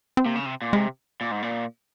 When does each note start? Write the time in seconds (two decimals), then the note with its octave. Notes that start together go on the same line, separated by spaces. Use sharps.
0.17 C4
0.25 C3 A#3
0.36 C#3
0.45 C3
0.62 A#2
0.73 C3 G#3
1.21 A#2
1.31 G#2
1.43 A#2